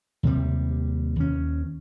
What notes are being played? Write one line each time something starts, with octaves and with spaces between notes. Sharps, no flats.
D#2 C3 G3
D#2 C#4